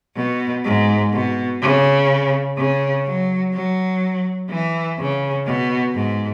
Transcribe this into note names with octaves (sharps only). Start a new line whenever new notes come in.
B2
G#2
B2
C#3
C#3
F#3
F#3
E3
C#3
B2
G#2